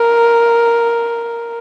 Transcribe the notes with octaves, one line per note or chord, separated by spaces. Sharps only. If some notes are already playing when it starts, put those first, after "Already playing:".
Already playing: A#4